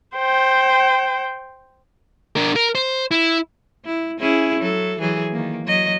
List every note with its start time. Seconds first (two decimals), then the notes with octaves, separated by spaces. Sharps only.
0.17 C5 G5
2.36 D4 A#4
2.56 A#4
2.75 C5
3.11 E4
3.85 E4
4.18 C#4 E4 G#4
4.60 F#3 A4
4.99 E3 F#3 G#4
5.32 D#3 A#3
5.65 F#3 D#5